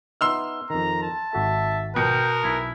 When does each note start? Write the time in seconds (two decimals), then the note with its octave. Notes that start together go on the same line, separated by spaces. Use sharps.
0.21 B3 D#4 E5 C6 E6 F6
0.70 F2 D#3 A#5
1.03 A5
1.33 G#1 F#4 A4 E5
1.96 B2 A#4 G5
2.44 B1 E4